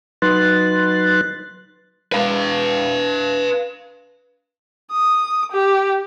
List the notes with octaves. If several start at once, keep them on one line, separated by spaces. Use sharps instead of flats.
F#3 D#4 B4 C6 F#6 A6
B4 F5
D#6
G4